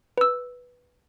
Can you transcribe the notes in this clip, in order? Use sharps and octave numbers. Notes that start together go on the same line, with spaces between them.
B4 E6